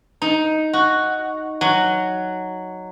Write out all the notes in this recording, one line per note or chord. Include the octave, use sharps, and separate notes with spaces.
D#4
F#4
F#3